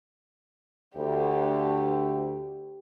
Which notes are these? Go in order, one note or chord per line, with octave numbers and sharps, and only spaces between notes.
D2 G4